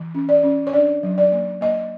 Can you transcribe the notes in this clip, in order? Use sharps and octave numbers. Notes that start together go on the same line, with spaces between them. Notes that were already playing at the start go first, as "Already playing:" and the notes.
Already playing: E3
C#4
D5
C#4
C#5
D4 D5
F#3
D5
A#3
A#3 D#5